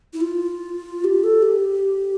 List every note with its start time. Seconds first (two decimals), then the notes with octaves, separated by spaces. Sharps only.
0.13 E4
0.21 F4
1.04 G4
1.24 A4
1.42 G4